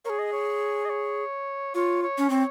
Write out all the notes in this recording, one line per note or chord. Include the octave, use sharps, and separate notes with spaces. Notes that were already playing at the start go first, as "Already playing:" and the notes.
G#4 A#4 C#5
D#5
C#5
D#5
C#5
F4 C#5
C#5
C#4
C4 C#5